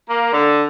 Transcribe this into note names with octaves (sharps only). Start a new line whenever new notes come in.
A#3
D3